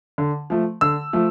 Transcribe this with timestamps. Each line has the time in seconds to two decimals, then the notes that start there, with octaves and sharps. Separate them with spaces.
0.18 D3
0.50 F3 A3
0.81 D3 E6
1.13 F3 A3